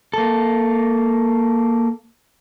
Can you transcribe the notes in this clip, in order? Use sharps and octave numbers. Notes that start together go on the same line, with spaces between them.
A#3 A4